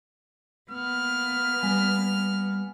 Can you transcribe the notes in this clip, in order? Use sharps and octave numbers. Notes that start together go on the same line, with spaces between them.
A#3 B3 F6
G3 G#5